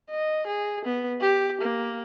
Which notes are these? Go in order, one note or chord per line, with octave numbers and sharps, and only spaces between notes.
D#5
G#4
B3
G4
A#3